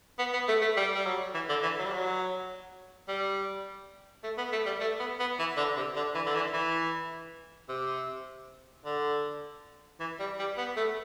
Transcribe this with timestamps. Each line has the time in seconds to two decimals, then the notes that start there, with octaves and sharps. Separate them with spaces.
0.18 B3
0.33 B3
0.48 A3
0.62 A3
0.77 G3
0.95 G3
1.05 F#3
1.34 E3
1.49 D3
1.63 E3
1.78 F#3
1.85 G3
1.92 F#3
3.08 G3
4.23 A3
4.37 B3
4.52 A3
4.66 G3
4.80 A3
4.99 B3
5.20 B3
5.39 E3
5.57 D3
5.77 C3
5.96 D3
6.15 E3
6.26 D3
6.35 E3
6.53 E3
7.69 C3
8.85 D3
10.00 E3
10.19 G3
10.39 G3
10.57 B3
10.76 A3